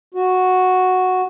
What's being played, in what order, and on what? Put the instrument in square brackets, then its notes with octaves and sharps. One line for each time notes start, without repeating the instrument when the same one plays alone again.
[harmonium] F#4